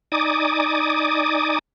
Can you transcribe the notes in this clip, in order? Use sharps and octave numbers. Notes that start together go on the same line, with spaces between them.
D#4 D5 G#5 D6 D#6